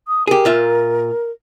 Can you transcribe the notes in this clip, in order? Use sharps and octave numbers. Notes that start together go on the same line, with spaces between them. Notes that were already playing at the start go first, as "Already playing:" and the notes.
D#6
G4 G#4 A#4
A#2 F4 E5